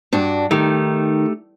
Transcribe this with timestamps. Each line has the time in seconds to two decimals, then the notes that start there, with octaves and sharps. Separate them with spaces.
0.13 G2 D4 F#4
0.51 D#3 A3 D#4 G4